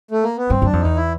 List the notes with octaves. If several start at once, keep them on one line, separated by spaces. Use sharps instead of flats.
A3
A#3
B3
G2 C4
F#2 D4
F2
E2 D#4
E4